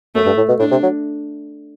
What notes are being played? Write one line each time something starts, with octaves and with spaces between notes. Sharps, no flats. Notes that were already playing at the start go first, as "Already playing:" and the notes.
F#2 A3
G2
A2
B2
A2 D4
C3
F#3